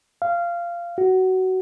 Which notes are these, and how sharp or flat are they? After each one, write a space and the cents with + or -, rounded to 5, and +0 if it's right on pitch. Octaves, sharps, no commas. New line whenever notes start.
F5 -15
F#4 +20